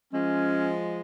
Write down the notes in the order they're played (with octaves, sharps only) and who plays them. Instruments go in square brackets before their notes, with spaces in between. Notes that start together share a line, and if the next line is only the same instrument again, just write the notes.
[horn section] F3 G#3 [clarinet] C#4